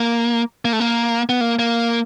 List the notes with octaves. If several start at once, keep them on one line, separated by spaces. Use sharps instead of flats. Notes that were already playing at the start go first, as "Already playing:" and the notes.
Already playing: A#3
A#3
A3
A#3
B3
A#3
A#3